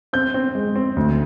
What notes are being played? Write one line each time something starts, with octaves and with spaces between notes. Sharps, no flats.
C4 G6
C4
G#3
C4
D2